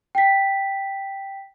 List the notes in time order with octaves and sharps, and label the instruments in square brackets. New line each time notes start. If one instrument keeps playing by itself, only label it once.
[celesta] G5 B6